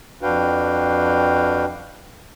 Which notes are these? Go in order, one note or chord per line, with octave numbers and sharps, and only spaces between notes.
F2 D4 F#4 B4 F5 G5